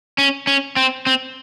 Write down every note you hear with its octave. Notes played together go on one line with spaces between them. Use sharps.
C#4
C#4
C4
C4